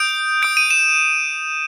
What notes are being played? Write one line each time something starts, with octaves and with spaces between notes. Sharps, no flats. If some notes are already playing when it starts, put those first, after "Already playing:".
Already playing: D#6 G6 D7
D#6 G6 D7
D#7
E7